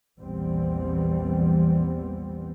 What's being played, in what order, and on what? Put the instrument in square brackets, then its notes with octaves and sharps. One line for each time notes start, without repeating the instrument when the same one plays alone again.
[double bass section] A#1 E2 E3 G3 B3 C4